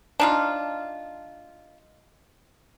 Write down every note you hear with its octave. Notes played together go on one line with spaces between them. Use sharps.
D4 D#4 F4